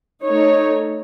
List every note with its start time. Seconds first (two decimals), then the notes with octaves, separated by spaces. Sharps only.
0.24 A3 D#4 C#5